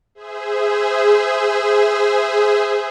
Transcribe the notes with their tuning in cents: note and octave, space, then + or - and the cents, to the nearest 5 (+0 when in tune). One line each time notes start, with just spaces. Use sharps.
G#4 +0 C5 -25 E5 +0